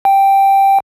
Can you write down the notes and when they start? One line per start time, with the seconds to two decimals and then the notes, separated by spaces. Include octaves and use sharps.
0.05 G5